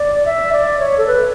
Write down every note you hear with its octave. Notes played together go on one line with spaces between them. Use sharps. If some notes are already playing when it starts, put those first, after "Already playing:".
Already playing: D5
E5
D5
C#5
A4
B4